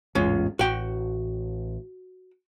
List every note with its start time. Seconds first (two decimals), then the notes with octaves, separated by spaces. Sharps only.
0.15 A1 E2 G#2 G#3 C#4 F4
0.59 A1 F#4 G5